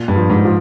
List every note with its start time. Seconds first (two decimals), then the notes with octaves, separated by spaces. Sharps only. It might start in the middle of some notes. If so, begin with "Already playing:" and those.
Already playing: A#2
0.08 G2
0.16 F3
0.30 G#2
0.45 F3